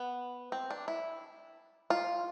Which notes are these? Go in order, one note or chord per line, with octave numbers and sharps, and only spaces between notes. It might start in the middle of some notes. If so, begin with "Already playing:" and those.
Already playing: B3
C4
D4
E4
F4